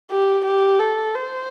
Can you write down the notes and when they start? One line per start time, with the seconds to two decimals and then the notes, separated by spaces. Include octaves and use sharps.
0.11 G4
0.45 G4
0.80 A4
1.15 C5